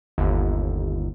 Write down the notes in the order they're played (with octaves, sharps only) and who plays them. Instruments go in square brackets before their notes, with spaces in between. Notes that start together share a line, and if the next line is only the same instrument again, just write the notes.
[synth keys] G1 D#2